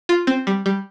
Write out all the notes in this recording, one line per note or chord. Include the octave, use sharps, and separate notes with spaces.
F4
C4
G3
G3